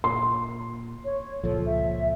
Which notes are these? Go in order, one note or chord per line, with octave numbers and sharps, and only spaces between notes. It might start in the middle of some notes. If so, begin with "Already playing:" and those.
A#2 C6
C#5
C#2 A#2 F3 A4
E5